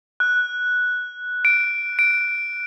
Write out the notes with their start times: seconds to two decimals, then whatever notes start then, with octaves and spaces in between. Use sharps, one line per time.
0.20 F#6
1.45 D7
1.99 D7